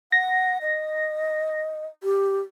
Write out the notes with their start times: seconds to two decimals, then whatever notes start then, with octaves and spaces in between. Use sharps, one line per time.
0.12 F#5 A#6
0.62 D#5
2.03 G4